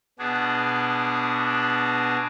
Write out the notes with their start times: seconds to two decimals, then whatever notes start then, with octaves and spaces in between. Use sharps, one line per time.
0.19 B2 B3 D4 F#4 G#4